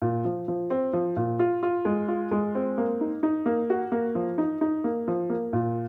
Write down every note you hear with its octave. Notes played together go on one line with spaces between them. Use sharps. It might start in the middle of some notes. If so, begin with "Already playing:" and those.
A#2
F3
F3
C4
F3
A#2
F4
F4
G#3
F4
G#3
C4
A#3
D#4
D#4
A#3
F#4
A#3
F3
D#4
D#4
A#3
F3
A#3
A#2